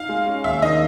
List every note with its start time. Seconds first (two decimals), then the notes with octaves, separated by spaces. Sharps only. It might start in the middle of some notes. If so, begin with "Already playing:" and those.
Already playing: D#4 F5
0.09 G#3
0.27 C#4
0.44 D#2 E5
0.62 D#3 D#5